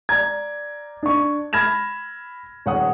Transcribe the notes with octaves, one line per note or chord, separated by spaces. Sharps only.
D5 A#5 G#6
D4 C#6
B5 F6 G#6 A#6 E7
D#1 C#5 F#5 D#6